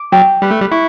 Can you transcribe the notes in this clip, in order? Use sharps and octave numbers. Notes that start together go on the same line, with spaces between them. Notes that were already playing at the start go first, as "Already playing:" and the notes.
Already playing: D6
F#3 G5
G3 B4
A3
G3
E4 C#6